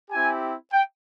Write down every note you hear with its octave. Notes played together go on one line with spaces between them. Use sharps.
C4 E4 G4 G#5
G5